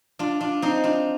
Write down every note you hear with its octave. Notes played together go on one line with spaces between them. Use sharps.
D4 F4
D4 F4
C4 D#4
D4 F4